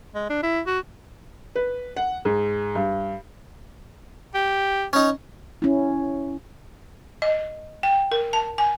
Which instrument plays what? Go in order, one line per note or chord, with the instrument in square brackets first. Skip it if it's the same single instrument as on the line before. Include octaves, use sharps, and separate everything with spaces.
[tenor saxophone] G#3
D4
E4
F#4
[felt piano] B4
F#5
G#2
G2
[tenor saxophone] G4
[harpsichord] C#4 D#4
[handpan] C#4 E4
[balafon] D#5
G5
A#4
A5
G#5